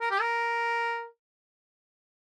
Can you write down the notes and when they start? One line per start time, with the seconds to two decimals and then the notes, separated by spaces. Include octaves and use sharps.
0.01 A#4
0.11 G4
0.21 A#4